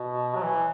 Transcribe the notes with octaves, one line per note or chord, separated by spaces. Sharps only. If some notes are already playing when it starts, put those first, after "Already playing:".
Already playing: B2
F#3
E3